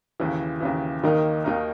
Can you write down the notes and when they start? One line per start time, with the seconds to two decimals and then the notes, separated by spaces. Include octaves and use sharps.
0.20 D#2 C#3 E3
0.60 D#2 C#3 E3
1.03 D#2 D#3 A#3 D#4 A#4
1.44 D#2 D#3 A#3 D#4 A#4